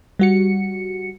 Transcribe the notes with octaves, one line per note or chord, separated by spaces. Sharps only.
G3 F#4 C#7